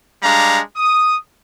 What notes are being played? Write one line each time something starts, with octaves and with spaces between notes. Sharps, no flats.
G3 G#3 D4 F5 A#5
D#6